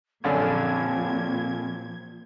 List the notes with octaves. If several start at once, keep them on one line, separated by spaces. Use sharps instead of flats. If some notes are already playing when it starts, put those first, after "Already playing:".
A#1 F#2 A#2 D3 F3 C4 G#6